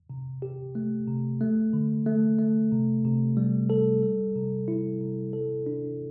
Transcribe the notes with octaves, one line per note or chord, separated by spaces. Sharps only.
C3
G4
A3
C3
A3
D3
A3
A3
C3
C3
G3
A4
G3
C3
E4
C3
A4
D4